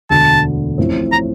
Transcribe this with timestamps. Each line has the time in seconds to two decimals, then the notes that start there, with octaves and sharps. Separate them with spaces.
0.10 E1 D2 D3 A5
0.78 A1 A2 F3 C4
1.12 A#5